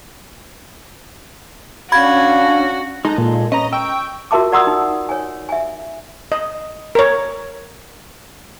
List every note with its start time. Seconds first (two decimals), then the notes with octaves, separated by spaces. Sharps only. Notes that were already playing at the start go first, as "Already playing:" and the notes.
1.92 C#4 D4 F#4 F5 B5 G#6
3.05 G#3 D#4 A4 F#6
3.18 A#2
3.52 C#4 B4 D#5 A#5
3.73 G5 C#6 E6
4.31 F4 F#4 A#4 E5 A5 D6
4.52 D5 F#5 A#5 C6 D#6 E6
4.67 D#4
5.09 C#5 G#5
5.49 E5 G#5
6.32 D#5
6.95 A#4 C#5